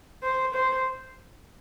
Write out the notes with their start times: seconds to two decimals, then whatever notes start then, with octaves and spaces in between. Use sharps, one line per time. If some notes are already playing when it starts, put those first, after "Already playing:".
0.23 C5
0.54 C5